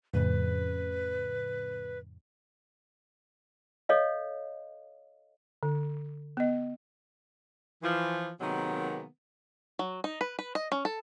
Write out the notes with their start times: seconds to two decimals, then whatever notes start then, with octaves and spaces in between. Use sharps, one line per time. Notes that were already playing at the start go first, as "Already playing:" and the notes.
0.14 F2 A2 C#3 B4
3.89 A4 C#5 D#5 F5
5.63 D3
6.37 B3 D#5
7.83 E3 F3
8.41 C3 D#3 F#3 G#3 A#3 B3
9.79 F#3
10.04 D#4
10.21 B4
10.39 B4
10.55 D#5
10.72 C#4
10.85 A4